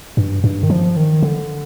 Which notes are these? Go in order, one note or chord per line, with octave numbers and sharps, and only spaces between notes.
G2
G2
D#3
F3
D#3
D3